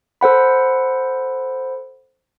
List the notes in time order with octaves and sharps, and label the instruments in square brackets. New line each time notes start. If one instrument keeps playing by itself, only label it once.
[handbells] A4 C5 F#5 B5